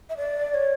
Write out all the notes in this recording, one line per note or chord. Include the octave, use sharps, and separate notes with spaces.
E5
D5
C#5